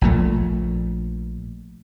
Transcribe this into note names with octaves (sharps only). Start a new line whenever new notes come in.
A#1 A#2 A3